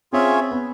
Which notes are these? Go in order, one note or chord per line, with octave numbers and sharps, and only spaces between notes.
C4 C#4 F4 G#4 C#5 E5
B3